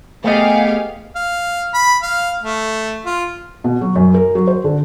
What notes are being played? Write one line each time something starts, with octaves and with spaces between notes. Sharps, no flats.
A3 B3 G4 G#4 D#5 F5
F5
B5
F5
A3
F4
B2
F#3
F#2
A#4
F#3
C5
D3